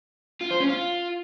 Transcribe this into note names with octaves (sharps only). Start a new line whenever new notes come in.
F4
C5
C#4
F4